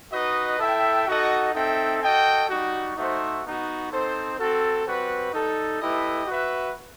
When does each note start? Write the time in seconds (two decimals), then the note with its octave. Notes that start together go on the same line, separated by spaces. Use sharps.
0.11 D#4 F#4 B4 D#5
0.59 E4 A4 E5 G5
1.07 D#4 F#4 A4 D#5 F#5
1.54 C4 D#4 A4 E5 G5
2.01 F#4 A4 D#5 G5
2.49 G3 D#4 F#4
2.96 A3 D#4 F#4 C5 E5
3.44 B3 D#4 F#4
3.90 C4 D#4 A4 C5
4.38 C4 F#4 A4
4.85 G3 C4 F#4 B4
5.32 G3 D#4 A4
5.80 A3 E4 G4 B4 D#5
6.27 F#4 B4 E5